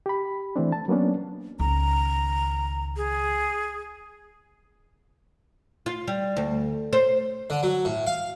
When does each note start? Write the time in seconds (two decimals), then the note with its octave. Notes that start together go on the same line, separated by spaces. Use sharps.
0.06 G4 B5
0.56 E3 A3 C4 D4
0.72 A5
0.88 F#3 A#3 B3 C#4 D4
1.60 C#2 D#3 A#5
2.97 G#4
5.86 F4
6.07 G3
6.37 D2
6.93 C5
7.50 D3
7.63 F#3
7.85 A2
8.07 F5